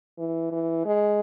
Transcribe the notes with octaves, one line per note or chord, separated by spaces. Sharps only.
E3
E3
G#3